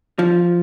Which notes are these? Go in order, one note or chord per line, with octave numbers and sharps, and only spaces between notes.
F3